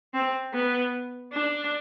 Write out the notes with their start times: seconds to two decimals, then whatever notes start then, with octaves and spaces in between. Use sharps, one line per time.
0.14 C4
0.53 B3
1.32 D4